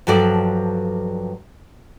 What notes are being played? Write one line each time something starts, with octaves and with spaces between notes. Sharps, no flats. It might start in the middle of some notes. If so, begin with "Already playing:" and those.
G2 F3 F#3 A4 D5